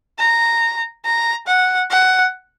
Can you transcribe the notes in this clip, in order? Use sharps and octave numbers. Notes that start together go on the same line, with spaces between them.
A#5
A#5
F#5
F#5